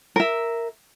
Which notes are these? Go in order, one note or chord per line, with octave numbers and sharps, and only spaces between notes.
A#4 E5